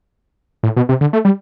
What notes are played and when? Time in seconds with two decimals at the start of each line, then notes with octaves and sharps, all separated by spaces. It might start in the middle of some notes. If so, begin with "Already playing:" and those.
0.63 A2
0.76 B2
0.89 C3
1.01 D3
1.13 A3
1.25 G3